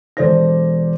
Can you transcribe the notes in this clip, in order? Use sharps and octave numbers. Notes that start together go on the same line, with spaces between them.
E1 A4 C5 D5 A#6